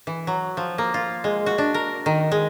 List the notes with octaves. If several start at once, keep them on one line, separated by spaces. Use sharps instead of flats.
E3
F#3
F3
A#3
F4
G#3
F#4
D4
A#4
D#3
G#3